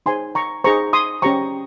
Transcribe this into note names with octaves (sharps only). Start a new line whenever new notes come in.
D#4 G#4 C5 G#5 C6
A#5 C#6
D#4 G#4 C5 A#5 C#6
C6 D#6
C#4 G4 C5 A#5 C#6